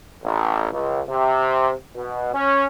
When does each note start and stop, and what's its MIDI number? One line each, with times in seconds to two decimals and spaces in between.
0.23 0.68 33
0.73 1.00 37
1.08 1.72 48
1.95 2.30 47
2.34 2.64 61